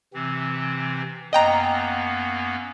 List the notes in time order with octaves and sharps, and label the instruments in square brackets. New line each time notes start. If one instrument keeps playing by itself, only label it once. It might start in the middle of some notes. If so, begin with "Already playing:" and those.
[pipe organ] C3 E3 C4
[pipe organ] F#2 A#3 B3 [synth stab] D#5 G5 A#5